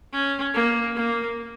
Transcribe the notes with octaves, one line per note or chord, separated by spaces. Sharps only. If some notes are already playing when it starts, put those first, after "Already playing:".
C#4
A#3
A#3